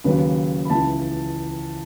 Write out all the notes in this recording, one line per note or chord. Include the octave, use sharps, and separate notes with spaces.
D#2 C#3 F#3 B4
B5
C#2 C#3 E3 A5